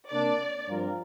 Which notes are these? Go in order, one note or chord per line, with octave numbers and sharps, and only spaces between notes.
C3 A#3 D4 D5
G2 F3 C4 F4 A#4